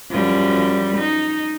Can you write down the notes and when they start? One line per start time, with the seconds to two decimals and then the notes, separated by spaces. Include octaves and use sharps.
0.11 F#2 F3 G3
0.97 D#4